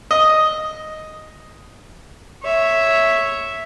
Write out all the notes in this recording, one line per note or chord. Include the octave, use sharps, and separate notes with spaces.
D#5
C#5 E5